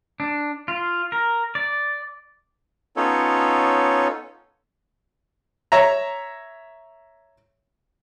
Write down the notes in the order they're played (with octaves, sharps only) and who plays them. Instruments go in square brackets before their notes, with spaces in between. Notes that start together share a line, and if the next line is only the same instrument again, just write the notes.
[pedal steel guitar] D4
F4
A#4
D5
[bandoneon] B3 C#4 D#4 F4 A4 C#5
[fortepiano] C#5 E5 A#5